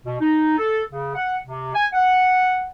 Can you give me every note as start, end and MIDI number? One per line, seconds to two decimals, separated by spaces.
0.05 0.15 47
0.20 0.55 63
0.58 0.81 69
0.92 1.14 49
1.15 1.36 78
1.45 1.70 48
1.73 1.86 80
1.93 2.66 78